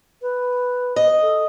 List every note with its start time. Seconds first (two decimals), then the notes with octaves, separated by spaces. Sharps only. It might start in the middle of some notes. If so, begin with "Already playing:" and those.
0.22 B4
0.96 D#5
1.22 A4